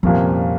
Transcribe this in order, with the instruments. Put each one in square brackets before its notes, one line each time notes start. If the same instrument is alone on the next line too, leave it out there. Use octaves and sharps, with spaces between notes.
[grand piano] C2 A#2 F3 A#3 C#4 [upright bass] F2